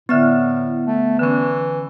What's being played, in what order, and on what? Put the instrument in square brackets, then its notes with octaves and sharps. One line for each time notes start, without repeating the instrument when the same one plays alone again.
[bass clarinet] A2 [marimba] D3 E5 F6 [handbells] B3
[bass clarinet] A3
[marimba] D3 C#4 [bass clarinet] E3